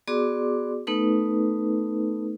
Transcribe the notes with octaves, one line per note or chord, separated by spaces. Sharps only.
B3 F#4 G#4 D5 C6 D6
A3 B3 D#4 A4 B4